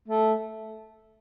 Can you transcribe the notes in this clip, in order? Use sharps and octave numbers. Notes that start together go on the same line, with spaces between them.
A3